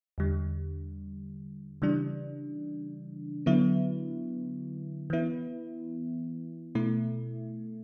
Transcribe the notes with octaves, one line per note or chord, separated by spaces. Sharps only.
E2 D3 G3
C#3 E3 G3 D4
D3 F#3 B3 E4
E3 B3 E4
B2 A3 E4